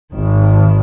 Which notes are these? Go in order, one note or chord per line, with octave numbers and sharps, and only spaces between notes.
G#1 D#3